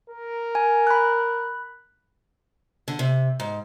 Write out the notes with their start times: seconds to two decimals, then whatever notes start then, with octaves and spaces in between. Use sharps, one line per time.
0.10 A#4
0.55 G#5
0.87 B5 F#6
2.88 D3
2.99 C3
3.40 G#2